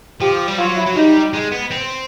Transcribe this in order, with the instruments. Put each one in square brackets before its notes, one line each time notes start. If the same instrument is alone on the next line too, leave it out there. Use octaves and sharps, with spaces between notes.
[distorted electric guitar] F3 [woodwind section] G4
[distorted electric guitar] G3
[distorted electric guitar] F#3 [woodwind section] F4
[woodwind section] E4
[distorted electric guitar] F#3
[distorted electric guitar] G3 [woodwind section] D#4
[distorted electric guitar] G#3
B3
C4